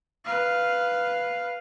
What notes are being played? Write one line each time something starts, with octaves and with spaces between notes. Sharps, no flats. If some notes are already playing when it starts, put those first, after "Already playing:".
B4 F5